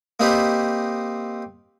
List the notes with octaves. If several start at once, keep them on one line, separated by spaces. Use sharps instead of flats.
A#3 C4 D#4 G4 B4 C5